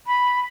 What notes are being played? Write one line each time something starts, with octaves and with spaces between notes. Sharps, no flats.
B5